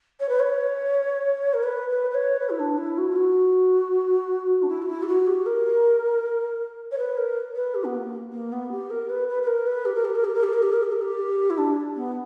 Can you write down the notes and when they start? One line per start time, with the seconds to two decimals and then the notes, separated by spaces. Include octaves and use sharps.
0.20 C#5
0.29 B4
0.40 C#5
1.53 A#4
1.63 B4
1.89 B4
2.11 B4
2.14 C#5
2.39 B4
2.50 E4
2.59 D4
2.77 E4
2.98 F#4
3.12 E4
3.16 F#4
4.62 D4
4.69 E4
4.82 F#4
4.88 E4
5.03 G4
5.08 F#4
5.27 G4
5.46 A#4
6.91 C#5
6.98 B4
7.17 A#4
7.55 B4
7.75 G4
7.84 B3
7.95 A#3
8.32 A#3
8.52 B3
8.71 G4
8.90 A#4
9.09 B4
9.28 B4
9.43 B4
9.47 A#4
9.67 B4
9.85 G4
9.95 A#4
10.05 G4
10.15 A#4
10.24 G4
10.34 A#4
10.43 G4
10.53 A#4
10.63 G4
10.73 A#4
10.83 G4
10.92 A#4
11.01 G4
11.50 E4
11.58 D4
11.96 B3